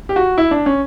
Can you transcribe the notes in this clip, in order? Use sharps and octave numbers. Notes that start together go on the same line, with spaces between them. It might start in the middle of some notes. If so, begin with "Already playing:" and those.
G4
F#4
E4
D4
C#4